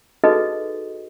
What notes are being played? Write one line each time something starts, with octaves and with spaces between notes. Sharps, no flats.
D#4 F#4 G#4 A4 B4 D#5